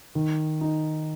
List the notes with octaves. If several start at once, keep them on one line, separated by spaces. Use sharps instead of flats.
D#3
D#4